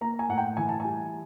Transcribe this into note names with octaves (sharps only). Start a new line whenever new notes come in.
A#3 A#5
G#5
A2 F#5
G5
E3 G#5
A5
G3 G#5